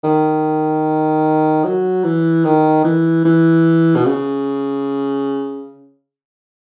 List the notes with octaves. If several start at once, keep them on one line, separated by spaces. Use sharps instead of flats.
D#3
F#3
E3
D#3
E3
E3
B2
C#3